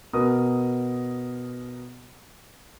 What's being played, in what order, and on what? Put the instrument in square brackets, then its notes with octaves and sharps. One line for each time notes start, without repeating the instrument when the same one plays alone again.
[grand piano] B2 A#4 D#6